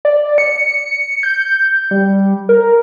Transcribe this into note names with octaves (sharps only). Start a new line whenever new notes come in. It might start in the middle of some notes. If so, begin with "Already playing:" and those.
D5
C#7
G6
G3
A#4